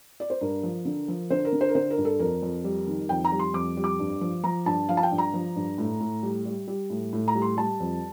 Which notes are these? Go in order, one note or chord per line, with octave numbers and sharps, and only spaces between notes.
D5
C5
G2 A#4
F3
D3
F3
D3 C5
A#4
D3
C5
A#4
D3 C5
A#4
G2
A4
F2 A#4
F2
G3
D#3
F2 G5
A#5
G3
C6
F2 D6
G3
D6
G2
F3
F3 A#5
G2 A5
F3 F5
A5
G5
G2
A#5
F3
G2
A2
A2
G3
G3
G3
A2
A2
A#5
G3
C6
G3 A5
F2